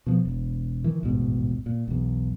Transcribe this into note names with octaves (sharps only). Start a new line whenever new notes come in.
B2 F3
E1
D#3 E3
A1 D#2 G#2 B2
A#2
B1 E2